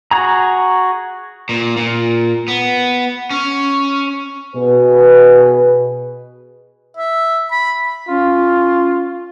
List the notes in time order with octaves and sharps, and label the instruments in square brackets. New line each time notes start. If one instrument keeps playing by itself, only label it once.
[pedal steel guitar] F#4 G#4 A#5
[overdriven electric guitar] A#2
A#2
B3
C#4
[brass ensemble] B2 G#4 B4
[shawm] E5
B5
[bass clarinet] C#4 [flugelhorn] F4